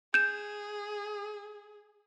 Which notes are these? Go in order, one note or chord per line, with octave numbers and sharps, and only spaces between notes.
G#4 G6 E7